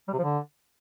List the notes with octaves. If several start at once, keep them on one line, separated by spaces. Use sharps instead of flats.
G3
C3
F3
D3